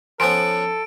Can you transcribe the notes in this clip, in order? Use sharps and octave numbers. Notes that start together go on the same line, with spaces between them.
F3 B3 C#4 A4 C5 G#5 C6 D7